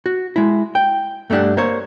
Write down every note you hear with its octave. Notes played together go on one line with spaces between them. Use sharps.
F#4
G#3 E4
G5
G2 A3 B3 D4 G4 F#5
A#3 C5 C#5